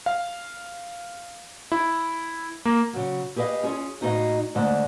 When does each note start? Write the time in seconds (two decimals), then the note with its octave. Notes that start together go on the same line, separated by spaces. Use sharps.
0.06 F5
1.72 E4
2.65 A#3
2.93 C#3 F#3
3.36 G4 G#4 B4 D#5 F5
3.64 C#4 F4 G#4
4.01 A2 D#4 F#4 D5 D#5 F5
4.55 D#2 G#2 D3 A3 A#3